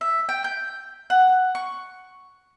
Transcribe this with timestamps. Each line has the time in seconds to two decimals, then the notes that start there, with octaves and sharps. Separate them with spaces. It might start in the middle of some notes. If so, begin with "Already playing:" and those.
0.01 E5
0.29 G5
0.44 G6
1.10 F#5
1.55 C#6